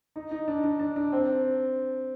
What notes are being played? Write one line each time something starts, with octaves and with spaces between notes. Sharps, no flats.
D#4
D#4
D4
D4
D4
D4
C4